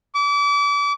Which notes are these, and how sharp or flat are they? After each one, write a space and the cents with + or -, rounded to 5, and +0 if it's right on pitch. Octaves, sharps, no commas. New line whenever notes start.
D6 -35